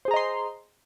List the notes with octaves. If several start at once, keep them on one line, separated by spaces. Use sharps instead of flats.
G#4 C5 D#5 A#5 C6